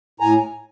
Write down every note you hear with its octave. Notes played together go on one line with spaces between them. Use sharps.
A2 G#5 A#5